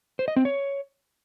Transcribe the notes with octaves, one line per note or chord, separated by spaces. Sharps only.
C5
D#5
C4
C#5